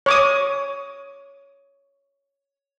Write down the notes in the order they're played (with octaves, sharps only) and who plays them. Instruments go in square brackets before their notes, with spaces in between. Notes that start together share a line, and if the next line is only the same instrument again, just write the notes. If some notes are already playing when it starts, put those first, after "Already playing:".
[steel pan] C#5 D6 D#6